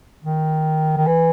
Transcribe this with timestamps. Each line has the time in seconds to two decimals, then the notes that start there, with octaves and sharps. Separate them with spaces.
0.25 D#3
0.97 D#3
1.07 E3